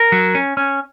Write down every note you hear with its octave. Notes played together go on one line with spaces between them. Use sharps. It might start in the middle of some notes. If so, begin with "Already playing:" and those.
Already playing: A#4
F#3
C#4
C#4